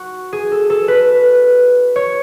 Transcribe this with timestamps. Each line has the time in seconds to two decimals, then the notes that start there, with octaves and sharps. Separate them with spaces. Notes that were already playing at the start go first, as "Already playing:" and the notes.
Already playing: F#4
0.33 G#4
0.52 A4
0.70 A4
0.88 B4
1.96 C#5